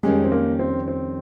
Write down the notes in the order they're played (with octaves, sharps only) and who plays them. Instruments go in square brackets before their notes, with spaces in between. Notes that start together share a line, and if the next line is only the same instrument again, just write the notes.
[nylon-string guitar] F2 D#3 G3 C#4 G4 [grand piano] G#3
[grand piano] C4
A#3
C4
C4